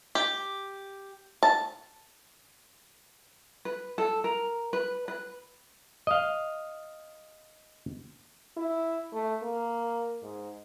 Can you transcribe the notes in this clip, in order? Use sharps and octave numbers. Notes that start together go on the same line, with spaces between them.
G4
A5
B4
A4
A#4
B4
B4
D#5 F5
E4
A3
A#3
G#2